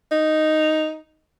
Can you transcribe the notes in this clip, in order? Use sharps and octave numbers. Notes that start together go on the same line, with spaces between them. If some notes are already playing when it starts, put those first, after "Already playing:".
D#4